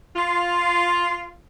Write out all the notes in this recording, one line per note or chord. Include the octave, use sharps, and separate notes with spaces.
F4